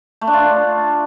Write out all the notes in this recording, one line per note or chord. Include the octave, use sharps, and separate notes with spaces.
A3
D4
F4